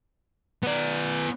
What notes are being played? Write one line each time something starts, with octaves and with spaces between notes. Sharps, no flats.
B3 D5